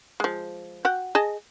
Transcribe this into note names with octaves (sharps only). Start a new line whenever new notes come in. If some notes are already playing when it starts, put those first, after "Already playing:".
F3 G#3
F#4 F#5 G5
G#4 D#5 A5